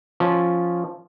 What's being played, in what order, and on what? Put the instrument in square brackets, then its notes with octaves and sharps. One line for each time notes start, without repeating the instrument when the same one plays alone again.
[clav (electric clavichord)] F3 C#4